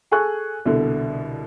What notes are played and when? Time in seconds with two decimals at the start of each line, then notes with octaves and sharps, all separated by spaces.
0.12 G#4 A4 G#5 C#6 F#6
0.65 C2 B2 D3